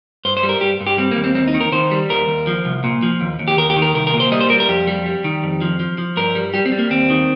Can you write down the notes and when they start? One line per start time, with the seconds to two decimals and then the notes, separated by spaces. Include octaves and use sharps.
0.25 G2 C5
0.37 C5
0.43 G3
0.49 A#4
0.61 G2 G4
0.81 G2
0.87 G4
0.98 G3 C4
1.11 A#3
1.17 D#2
1.24 C4
1.35 D#2 C4
1.48 D#4
1.54 D#3
1.61 A#4
1.72 D#3 C5
1.91 G3
2.09 D#2 A#4
2.28 D#2
2.47 F3
2.65 C2
2.84 A#2
3.03 F3
3.21 D#2
3.39 D#2
3.48 G4
3.57 D#2 A#4
3.70 G4
3.76 D#3
3.82 A#4
3.95 C2 A#4
4.07 A#4
4.14 A#2
4.20 C5
4.32 G3 D#5
4.41 C5
4.50 G3 A#4
4.60 A#4
4.69 F2 G4
4.87 G3
5.06 G3
5.24 D#3
5.43 F2
5.61 F3
5.80 F3
5.98 F3
6.17 G2 A#4
6.35 G3
6.54 G3 G4
6.66 C4
6.72 G3
6.79 A#3
6.90 D#2 C4
7.10 D#3